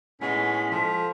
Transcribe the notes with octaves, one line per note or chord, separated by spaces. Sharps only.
A2 G#3 B3 C#4 D#4 B6
F3 A4